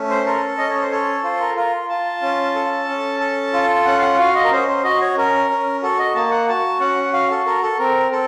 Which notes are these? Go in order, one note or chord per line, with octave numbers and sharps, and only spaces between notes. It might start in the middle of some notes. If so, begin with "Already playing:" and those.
Already playing: A3 C#4
C5
A4 A#4
C#4 D#5
C#5
C5
A4 C#5
F4 C5
A#4
F4 A#4
F4 A5
C#4
A4
C#4
A4
F4
C#4 F#5
F5
F#5
F#4 F5
D#5
A#4
C#4 C5
C5
F#4 D#5
C#5
C#4 A#4
C#4
F#4 A4
D#5
A#3 A5
F#5
F#4 A5
C#4 F#5
F#4 F5
A4
A4 A#4
A4
C4 A#4
C4 A4